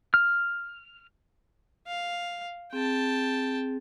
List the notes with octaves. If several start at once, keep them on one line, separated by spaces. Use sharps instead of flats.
F6
F5
C4 G#4 G5 A5